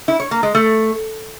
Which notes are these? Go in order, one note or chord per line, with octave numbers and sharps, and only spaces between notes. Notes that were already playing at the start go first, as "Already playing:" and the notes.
E4
C#5
A#3
G#3
A3